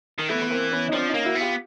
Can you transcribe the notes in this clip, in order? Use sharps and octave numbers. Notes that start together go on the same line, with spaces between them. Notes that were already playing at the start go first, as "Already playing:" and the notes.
D#3
E3 A3 B3
B3
A#3 C4
B3 C#4
D#4
F3 C4 D4
C#4 D#4
A#3
E4 F#4
B3
F4 G4